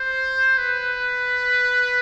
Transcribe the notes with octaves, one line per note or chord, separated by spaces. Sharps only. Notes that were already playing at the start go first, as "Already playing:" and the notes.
Already playing: C5
B4